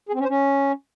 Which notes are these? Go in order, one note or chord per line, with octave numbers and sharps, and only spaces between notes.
G#4
C4
C#4
C5
C#4